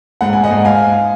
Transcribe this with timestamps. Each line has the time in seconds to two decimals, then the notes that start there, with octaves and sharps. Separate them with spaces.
0.21 G#2 F#5
0.33 G#5
0.44 D#5 F#5
0.51 G#2
0.65 F5 G#5